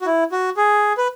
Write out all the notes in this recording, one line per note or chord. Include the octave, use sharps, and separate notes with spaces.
F#4
E4
F#4
G#4
B4